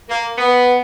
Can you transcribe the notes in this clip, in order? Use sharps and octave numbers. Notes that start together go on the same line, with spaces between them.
A#3
B3